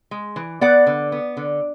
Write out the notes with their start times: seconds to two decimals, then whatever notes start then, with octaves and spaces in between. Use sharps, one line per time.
0.11 G#3
0.36 E3
0.61 B3 D5 F#5
0.87 D3
1.12 B3
1.37 D3